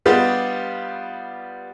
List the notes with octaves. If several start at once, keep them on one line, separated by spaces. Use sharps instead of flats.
G3 B3 D4 F4 G4 D#5